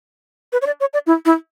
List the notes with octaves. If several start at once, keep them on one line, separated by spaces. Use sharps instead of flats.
B4
C#5
D5
C#5
D5
E4
E4